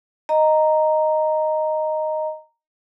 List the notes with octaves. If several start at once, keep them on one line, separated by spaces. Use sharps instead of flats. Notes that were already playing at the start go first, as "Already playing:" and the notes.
D#5 A#5